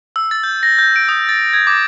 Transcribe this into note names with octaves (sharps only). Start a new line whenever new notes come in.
E6
A6
G6
A#6
G6
D7
D#6
A6
G#6
D6